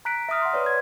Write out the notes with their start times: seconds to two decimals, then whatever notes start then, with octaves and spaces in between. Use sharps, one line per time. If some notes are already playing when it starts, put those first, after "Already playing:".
0.05 A#5 F#6 B6 D7
0.29 E5 A#5 D#6 F6
0.42 F#5 C6
0.54 B4 C#5 D5
0.66 G#6